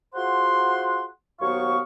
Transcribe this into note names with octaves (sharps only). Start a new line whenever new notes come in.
F4 F#4 G#4 C5 F#5 C6
D#2 F#3 B3 C5 F5 C#6